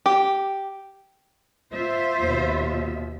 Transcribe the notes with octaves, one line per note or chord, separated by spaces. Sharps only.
G4
F4 C5 E5
D#2 B2